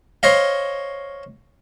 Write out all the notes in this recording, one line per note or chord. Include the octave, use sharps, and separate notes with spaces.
C5 C#5 D#5 F5